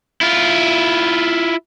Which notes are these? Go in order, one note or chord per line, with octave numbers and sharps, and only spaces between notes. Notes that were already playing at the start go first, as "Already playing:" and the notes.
E4 F4